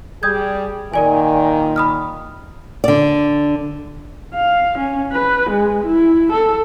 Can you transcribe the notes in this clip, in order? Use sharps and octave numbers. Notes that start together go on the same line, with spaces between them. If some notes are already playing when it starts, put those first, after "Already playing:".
G3 G#4 D#6 G6 G#6
A#2 D#3 A#4 D5 G#5
B5 D#6 F6
D3 D5
F5
C#4
B4
G#3
E4
A4